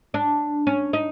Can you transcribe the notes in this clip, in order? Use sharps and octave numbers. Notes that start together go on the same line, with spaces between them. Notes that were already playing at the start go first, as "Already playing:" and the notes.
D4
C#4
D#4